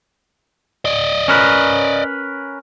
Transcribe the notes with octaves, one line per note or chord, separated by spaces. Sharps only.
D5 D#5
C#4 A#4 B4